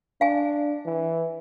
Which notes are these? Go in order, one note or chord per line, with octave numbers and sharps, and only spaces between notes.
D4 F5 G#5
E3